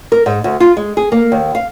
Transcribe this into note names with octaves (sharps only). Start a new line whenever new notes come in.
A#4
G#2
D2
F4
G#3
G#4
A#3
D#2
F5